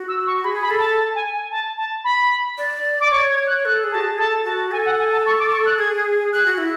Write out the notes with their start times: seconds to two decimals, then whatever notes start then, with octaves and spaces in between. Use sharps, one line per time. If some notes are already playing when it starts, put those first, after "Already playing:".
Already playing: F#4
0.08 E6
0.27 C#6
0.44 G#4 B5
0.62 B5
0.70 A4
0.79 A5
0.97 A5
1.15 G#5
1.33 G#5
1.51 A5
1.77 A5
2.04 B5
2.58 D5
3.00 D6
3.11 C#5 C#6
3.29 G#6
3.47 F#6
3.65 A4 F#6
3.83 G#4
3.92 F#4 A5
4.01 G#4
4.18 A4 A5
4.45 F#4 A5
4.71 A4 G#5
4.85 F#5
4.99 G#5
5.12 A5
5.26 C#6
5.39 D6
5.52 C#6
5.66 F#6
5.79 G#4 G#6
6.33 G#4 F#6
6.46 F#4
6.58 E4